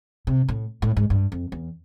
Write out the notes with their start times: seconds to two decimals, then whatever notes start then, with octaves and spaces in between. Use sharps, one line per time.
0.27 C3
0.49 A2
0.82 A2
0.97 G#2
1.10 G2
1.32 F2
1.52 E2